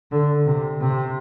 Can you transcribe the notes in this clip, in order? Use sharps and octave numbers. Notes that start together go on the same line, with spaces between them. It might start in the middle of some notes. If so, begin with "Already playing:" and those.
D3
C3
C3